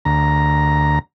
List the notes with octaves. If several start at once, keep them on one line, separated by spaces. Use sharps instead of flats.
D2 A#5